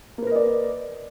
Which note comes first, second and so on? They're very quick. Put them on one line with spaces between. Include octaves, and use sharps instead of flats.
A#3 B4 A#4 D#5 D5